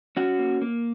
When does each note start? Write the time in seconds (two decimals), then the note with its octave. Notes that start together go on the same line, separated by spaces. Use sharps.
0.17 C#4 F#4
0.39 A#3
0.62 A#3